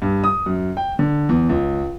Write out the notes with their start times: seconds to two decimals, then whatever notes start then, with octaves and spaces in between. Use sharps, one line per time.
0.02 G2
0.24 D#6
0.46 F#2
0.77 G5
0.99 D3
1.29 E2
1.49 C#2